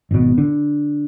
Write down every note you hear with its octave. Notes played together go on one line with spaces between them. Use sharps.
G#1 B2
D3